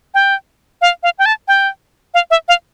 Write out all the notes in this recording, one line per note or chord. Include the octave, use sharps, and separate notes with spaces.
G5
F5
F5
G5
A5
G5
F5
E5
F5